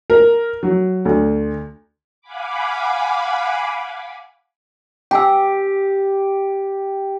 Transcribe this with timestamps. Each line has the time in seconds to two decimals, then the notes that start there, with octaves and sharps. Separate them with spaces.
0.10 A#4
0.63 F#3
1.05 D2
2.21 F5 F#5 G#5 B5 D6
5.11 G4 G5 G#5 E6